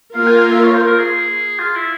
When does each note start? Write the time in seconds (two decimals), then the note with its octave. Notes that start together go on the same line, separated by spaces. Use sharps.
0.14 A#3 F4 A#4 F5
0.27 G#5
0.39 F5
0.51 E5
0.63 C#5
0.75 C5
0.87 A#4
0.99 G#4
1.59 F4
1.75 E4